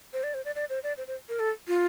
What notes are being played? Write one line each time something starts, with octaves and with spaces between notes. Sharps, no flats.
C5
D5
C5
D5
D5
C5
D5
C5
C5
A#4
A4
F4